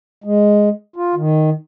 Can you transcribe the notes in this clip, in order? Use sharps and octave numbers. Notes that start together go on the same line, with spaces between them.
G#3
F4
D#3